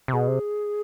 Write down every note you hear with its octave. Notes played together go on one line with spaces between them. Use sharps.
C3
B2 G#4
C3